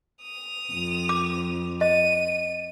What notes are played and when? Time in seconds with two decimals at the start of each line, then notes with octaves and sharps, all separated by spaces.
0.22 D#6 F7
0.72 F2
1.09 D6
1.81 D#5 D#7